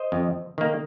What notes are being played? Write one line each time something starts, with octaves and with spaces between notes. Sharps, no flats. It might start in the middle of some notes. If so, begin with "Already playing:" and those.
Already playing: C5 D#5
F2
D#3 A#3